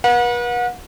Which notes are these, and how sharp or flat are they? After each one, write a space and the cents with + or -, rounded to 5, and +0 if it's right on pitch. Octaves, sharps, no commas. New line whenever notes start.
B4 -40 F#5 -35